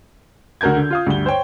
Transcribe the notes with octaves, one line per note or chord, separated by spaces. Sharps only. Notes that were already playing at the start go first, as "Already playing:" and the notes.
D2 F#4 A#4 G6 G#6
D3
F4 F5 D#6
D2 G2 G7
C5 C#5 G5